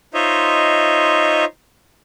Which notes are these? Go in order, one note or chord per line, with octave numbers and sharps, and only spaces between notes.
D#4 F4 C5 C#5 D#5 E5